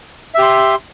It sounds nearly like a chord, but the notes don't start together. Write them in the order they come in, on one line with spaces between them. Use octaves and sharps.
E5 G4 C6